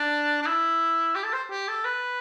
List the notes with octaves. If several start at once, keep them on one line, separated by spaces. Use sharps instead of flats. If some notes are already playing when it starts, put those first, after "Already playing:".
Already playing: D4
D4
E4
G4
A4
C5
G4
A4
B4